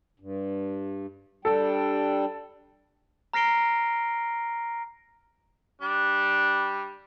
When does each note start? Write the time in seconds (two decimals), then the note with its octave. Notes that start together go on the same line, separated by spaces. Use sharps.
0.20 G2
1.45 G3 D4 A4 G5
3.33 A#5 F6 A#6 C7 D7 G7
5.81 G3 D4